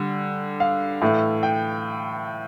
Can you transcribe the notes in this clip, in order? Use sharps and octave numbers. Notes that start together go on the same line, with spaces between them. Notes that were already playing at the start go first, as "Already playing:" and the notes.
Already playing: D3 G3
F5
A2 E3 A3
G5